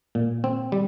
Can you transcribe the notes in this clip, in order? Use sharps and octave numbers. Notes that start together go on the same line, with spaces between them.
A#2
C4
G3